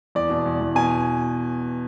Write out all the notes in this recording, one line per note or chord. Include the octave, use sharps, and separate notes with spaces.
E2 D5
B2
E2
E2
B2 G#5